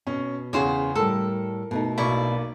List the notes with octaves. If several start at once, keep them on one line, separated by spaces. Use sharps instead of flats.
B2 C#4
E2 C#3 G#4 C5 C#5 F#5
A2 G3 A4 A#4
B2 A3 D#4
B1 A#3 E4 D5 C#6